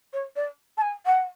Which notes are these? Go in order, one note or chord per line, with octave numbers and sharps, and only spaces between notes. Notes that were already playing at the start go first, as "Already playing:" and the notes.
C#5
D5
A5
G#5
F#5